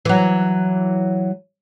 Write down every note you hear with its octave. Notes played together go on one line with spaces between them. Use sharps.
E3 F#3